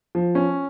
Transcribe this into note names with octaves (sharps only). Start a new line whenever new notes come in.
F3
C#4